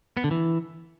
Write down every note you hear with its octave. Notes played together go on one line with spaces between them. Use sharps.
B3
D3
E3